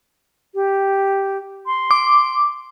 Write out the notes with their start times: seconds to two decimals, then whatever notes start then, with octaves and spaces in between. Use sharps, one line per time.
0.55 G4
1.66 C6
1.91 D6